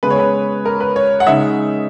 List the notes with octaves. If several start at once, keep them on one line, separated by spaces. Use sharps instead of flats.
C#3 G#3 B3 B4
C#5
B4
A#4
B4
C#5
F#5
C#3 G#3 D#4 E5